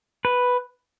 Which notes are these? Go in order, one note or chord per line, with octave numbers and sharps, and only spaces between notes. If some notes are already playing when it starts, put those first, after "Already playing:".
B4